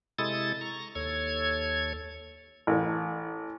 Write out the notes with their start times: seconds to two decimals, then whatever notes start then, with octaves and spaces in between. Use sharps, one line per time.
0.19 C3 G#3 E4 A4 D#6 A6
0.61 A#5 C#6
0.95 D#2 A4 C#5 G#6
2.67 A1